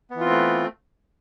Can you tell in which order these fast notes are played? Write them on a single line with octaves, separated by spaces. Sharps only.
B3 E3 F4 C4 A3